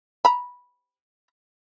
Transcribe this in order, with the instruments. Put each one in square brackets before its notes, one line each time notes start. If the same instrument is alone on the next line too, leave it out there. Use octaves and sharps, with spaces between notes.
[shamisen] A#5 B5